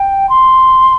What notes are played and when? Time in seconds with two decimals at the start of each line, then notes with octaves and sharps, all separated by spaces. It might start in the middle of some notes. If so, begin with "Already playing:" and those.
Already playing: G5
0.30 C6